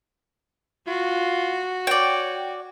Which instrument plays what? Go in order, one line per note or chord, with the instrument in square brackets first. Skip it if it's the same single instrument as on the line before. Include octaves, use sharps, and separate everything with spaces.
[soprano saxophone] F4 [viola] F#4
[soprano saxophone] C#5 [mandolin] D5 G5